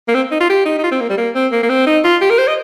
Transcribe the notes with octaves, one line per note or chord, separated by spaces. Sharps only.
A#3
C4
D#4
F4
G4
D#4
D#4
F4
C4
A#3
G3
A#3
C4
A#3
A#3
C4
D#4
F4
G4
A#4
C5
D#5